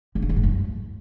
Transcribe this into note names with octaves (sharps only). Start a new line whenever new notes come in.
D3
F2
E2
A2
F#2